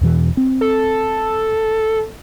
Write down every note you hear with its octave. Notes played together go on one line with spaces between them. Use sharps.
E2 B2 E3
C4
A4